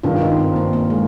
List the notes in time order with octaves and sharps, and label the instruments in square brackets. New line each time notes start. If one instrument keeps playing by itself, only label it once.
[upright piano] G#1 G2 D#3 [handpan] F4
[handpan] D#4
C4
A#3
A#3
G#3